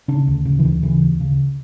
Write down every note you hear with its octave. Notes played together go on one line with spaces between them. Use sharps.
C#3 D4
D2
C#3
E3
D2
C#3 E3
D2
C#3